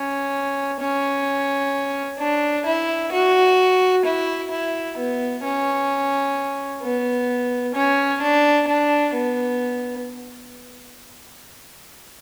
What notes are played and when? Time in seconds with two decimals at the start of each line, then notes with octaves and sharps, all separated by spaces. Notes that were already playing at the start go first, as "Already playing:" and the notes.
Already playing: C#4
0.80 C#4
2.20 D4
2.66 E4
3.12 F#4
4.05 E4
4.51 E4
4.97 B3
5.43 C#4
6.83 B3
7.74 C#4
8.21 D4
8.68 D4
9.13 B3